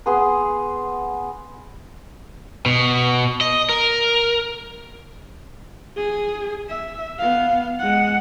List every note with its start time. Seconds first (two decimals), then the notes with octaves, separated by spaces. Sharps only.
0.06 B3 G#4 G#5 C6
2.66 B2
3.41 D#5
3.69 A#4
5.97 G#4
6.69 E5
7.19 B3 F5
7.79 G#3 F#5